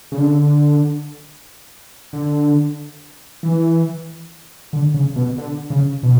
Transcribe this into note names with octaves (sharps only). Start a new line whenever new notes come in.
C#3
D3
D3
E3
D3
C#3
B2
D3
C#3
B2